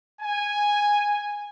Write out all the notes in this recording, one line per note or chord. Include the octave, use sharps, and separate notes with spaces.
G#5